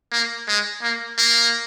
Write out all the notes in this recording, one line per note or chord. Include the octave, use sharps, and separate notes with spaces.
A#3
G#3
A#3
A#3